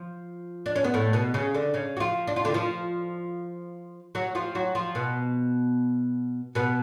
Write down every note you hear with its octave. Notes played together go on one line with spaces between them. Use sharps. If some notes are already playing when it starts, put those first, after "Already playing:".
Already playing: F3 F4
D4
C#4
B3
A2 A3
B2 B3
C#3 C#4
D3 D4
C#3 C#4
F#4
F3 F4
D4
F4
D3 D4
F3 F4
F#3 F#4
F3 F4
F#3 F#4
F3 F4
B2 B3
B2 B3